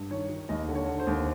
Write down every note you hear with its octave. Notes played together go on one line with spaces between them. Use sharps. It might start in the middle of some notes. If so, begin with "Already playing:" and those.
Already playing: G2
D#3 C#5
D#3
D#2 D#5
D3
C#5
D3
C5
D#2